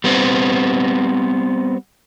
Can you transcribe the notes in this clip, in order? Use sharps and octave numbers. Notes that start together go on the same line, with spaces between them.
G3 B3 C4